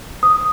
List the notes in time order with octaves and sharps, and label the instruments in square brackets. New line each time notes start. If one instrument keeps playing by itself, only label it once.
[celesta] D#6